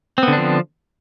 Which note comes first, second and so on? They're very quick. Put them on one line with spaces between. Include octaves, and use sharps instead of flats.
C4 B3 D3 D4 F3